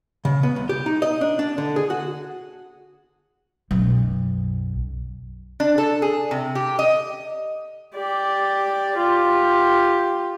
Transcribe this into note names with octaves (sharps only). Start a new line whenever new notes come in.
C#3
B3
C2
G4
D#4
D#5
D4
D4
D3
G#4
F#4
B1 F#2
D4
A4
G#4
C3
G4
D#5
G4 D5
F4 G4